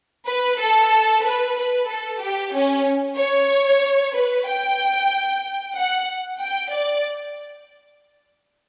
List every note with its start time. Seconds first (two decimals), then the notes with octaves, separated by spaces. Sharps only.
0.28 B4
0.60 A4
1.24 B4
1.57 B4
1.89 A4
2.22 G4
2.54 C#4
3.19 C#5
4.15 B4
4.48 G5
5.76 F#5
6.41 G5
6.73 D5